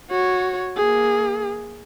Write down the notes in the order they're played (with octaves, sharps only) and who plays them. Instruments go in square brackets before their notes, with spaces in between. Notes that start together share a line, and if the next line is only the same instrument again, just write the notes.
[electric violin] F#4 C#5
A#3 G#4